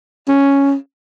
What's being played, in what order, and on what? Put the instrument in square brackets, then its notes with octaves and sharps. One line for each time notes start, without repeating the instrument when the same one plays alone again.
[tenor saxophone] C#4